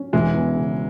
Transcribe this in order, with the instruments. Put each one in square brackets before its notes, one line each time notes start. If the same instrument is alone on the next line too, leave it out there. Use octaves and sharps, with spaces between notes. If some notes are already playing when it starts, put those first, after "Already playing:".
Already playing: [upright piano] C#4
[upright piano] E1 [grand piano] E3 G#3
[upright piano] E2
C#3